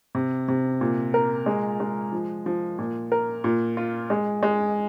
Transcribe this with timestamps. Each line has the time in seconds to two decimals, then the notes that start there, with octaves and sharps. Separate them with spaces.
0.15 C3
0.48 C3
0.81 A#2
1.14 A#4
1.46 G#3
1.80 G#3
2.12 F3
2.46 F3
2.78 A#2
3.12 A#4
3.44 A#2
3.77 F4
4.10 G#3
4.43 G#3